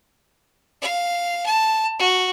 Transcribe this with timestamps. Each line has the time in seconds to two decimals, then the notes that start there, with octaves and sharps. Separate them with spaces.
0.82 F5
1.46 A5
1.99 F#4